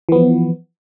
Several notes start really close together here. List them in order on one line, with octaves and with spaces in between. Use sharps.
E3 B3 F3